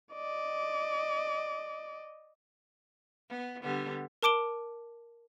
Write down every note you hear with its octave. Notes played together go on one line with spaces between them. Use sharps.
D5 D#5
B3
D3 G3 B3
A#4 A5 D6 D7 G7